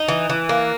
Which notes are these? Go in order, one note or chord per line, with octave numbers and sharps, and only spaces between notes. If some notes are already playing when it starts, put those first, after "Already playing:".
Already playing: D#4
E3
E3
A#3